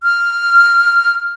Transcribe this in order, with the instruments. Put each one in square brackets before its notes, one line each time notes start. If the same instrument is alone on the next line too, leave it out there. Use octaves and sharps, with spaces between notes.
[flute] F6